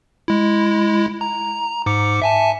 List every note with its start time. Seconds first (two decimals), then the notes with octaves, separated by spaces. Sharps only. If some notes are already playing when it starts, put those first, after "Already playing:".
0.28 G#3 E4
1.21 A#5
1.86 G#2 D6 C#7
2.22 E5 G#5 A5